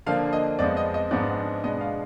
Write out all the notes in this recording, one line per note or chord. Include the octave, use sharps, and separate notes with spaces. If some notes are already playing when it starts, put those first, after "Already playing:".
D3 F3 A#3 D4 F5
D#5
F2 F3 G#3 B3 D5
D#5
D#5
G#2 F3 G#3 B3 D4 D5
B2 G#3 B3 D4 D#5
F5